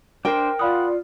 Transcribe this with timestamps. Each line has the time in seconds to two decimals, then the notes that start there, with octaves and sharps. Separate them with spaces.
0.25 D4 A#4 C5 G5
0.59 F4 D5 F5 F#5 B5 D#6